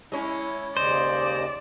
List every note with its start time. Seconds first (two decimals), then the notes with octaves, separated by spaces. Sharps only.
0.12 G#3 C#4 E4
0.77 D#2 C#3 C5 D5 D#5